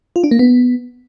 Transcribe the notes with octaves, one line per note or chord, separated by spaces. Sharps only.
F4
D4
A#3
B3